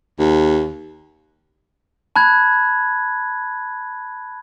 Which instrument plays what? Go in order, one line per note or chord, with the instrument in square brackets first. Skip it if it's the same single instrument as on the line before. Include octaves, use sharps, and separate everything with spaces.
[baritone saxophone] D#2
[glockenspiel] A5 B5 F#6 G#6